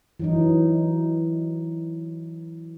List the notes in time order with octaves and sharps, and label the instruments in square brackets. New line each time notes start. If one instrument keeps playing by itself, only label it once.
[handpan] E3 F#3 D#4